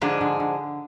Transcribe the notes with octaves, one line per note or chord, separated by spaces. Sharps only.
G#2 D3 F3 G#3 D4 G#4
D3
D3